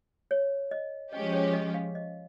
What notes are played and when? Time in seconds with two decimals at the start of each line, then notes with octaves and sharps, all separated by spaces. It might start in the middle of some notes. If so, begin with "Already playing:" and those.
0.31 C#5
0.71 D#5
1.13 F3 G#3 C#4 G4 D#5
1.33 C#5
1.53 D#5
1.74 F5
1.95 D#5